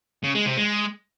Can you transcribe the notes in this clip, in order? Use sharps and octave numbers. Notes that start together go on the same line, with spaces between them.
C#3
G#3
C3
G#3